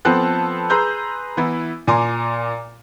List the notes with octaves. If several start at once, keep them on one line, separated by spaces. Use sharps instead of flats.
F3 B3 C4 A4 F#6
G#4 B4 A#5 C6 E6 G6
E3 B3 E4
A#2 G#5 A#5 C6 D6